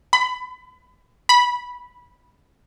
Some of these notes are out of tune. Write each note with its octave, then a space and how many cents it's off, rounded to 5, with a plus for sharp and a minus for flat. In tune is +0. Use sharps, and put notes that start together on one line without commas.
B5 +25
B5 -5